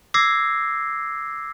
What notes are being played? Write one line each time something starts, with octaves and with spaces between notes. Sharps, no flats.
D6 E6 G#6 A#6 C7